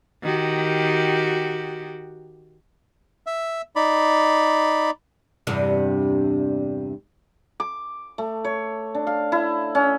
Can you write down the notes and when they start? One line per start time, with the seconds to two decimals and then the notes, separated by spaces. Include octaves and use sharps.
0.22 D#3 F#4 G4
3.26 E5
3.76 D#4 D5 B5
5.47 E2 G2 C3
7.60 D6
8.18 A3
8.45 C#5
8.95 D4
9.07 F5
9.32 E4
9.75 C#4